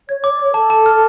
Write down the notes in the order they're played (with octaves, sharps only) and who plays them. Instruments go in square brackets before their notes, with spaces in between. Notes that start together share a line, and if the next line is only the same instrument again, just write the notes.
[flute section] C#5 [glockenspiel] G#6
[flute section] C#5 [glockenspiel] D6
[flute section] D5
[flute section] C#5 [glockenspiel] D6
[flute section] A4 [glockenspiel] A5
[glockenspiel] A5
F6